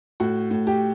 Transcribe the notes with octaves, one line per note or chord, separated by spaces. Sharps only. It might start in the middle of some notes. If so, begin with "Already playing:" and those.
A2 F#4
A2
G4